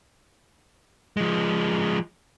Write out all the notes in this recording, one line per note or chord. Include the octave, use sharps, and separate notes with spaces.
F3 G#3